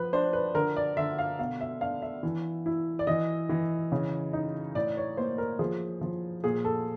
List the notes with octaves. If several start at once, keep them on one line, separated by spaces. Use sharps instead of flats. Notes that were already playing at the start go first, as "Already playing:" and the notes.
Already playing: F3 B4
D4 C5
B4
D3 A#4
D5
D3 E5
F5
B2 F5
E5
D4 F5
E5
E3
E4
D5
E3 D#5
E3
C#3
D#4
A2 D5
C#5
A#3 C5
A#4
F3 G#4
F3
A#2 G#4
A4